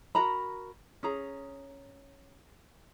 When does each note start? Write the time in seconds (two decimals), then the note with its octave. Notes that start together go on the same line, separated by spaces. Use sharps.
0.15 F#4 A#4 A#5 B5
1.03 C#4 G#4 A#5